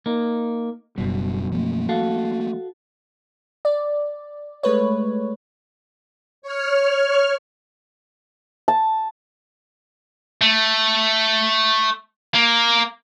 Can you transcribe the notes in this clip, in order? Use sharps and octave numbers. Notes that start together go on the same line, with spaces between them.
A#3 D#4
F#1 C#2 F#2 B2 G3
F3 A3 A#3
F#4 A4 F5
D5
G#3 A3 B4 C#5
C#5 F6
A5
A3
A#3